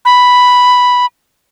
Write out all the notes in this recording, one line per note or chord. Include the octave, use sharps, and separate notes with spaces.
B5